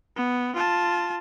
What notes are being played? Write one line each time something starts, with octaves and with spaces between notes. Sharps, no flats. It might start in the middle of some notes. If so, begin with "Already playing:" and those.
B3
F4 A5